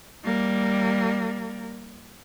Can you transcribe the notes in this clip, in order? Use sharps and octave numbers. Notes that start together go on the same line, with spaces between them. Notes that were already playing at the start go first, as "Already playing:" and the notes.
G3 A#3